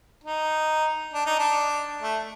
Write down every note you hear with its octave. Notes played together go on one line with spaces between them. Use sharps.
D#4
D4
D#4
D4
A3